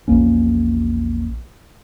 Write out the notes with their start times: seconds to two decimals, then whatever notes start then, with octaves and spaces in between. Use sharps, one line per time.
0.08 A#1 E2 A#3 C#4